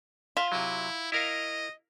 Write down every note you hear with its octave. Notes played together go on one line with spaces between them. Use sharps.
F4 E5
C3 F#3 E4
E4 A#4 D#5 F5